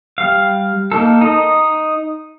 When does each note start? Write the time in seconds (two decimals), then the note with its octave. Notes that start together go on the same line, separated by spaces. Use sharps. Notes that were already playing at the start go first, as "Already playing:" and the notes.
0.18 G3 F5
0.92 A#3 D#4 A4
1.21 D#4 D#5